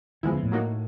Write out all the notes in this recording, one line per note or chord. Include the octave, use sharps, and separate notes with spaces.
D#3 F3 G#3 B3 E4
C#3
A2
F#3 A#3 D#4 F#4